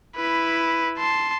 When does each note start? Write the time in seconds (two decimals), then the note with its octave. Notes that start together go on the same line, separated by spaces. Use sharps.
0.16 E4 B4
0.98 A5 C6